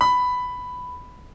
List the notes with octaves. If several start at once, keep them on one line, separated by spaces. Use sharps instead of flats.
B5